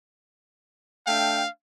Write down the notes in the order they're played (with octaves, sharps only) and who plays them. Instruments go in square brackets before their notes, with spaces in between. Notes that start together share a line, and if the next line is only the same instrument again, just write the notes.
[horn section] A3 D4 G5 [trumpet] F5